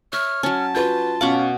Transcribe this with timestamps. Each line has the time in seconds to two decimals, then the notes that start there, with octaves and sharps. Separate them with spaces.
0.13 C#5 E5 F6
0.43 F#3 C#4 A5
0.74 F4 F#4 B4 G6
1.21 B2 C#4 F5 F#5 D6